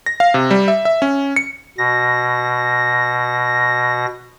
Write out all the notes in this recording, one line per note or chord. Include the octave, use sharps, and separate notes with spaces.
A#6
F5
C3
G3
E5
E5
C#4
C#7
B2 A#6